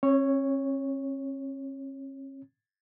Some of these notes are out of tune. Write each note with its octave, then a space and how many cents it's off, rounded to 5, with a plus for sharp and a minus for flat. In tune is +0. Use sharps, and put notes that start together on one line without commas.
C#4 -45 C#5 +0